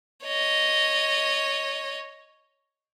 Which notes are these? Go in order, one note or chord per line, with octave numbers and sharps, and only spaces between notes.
C#5 D#5